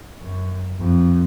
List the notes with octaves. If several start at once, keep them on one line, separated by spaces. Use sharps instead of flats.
F#2
F2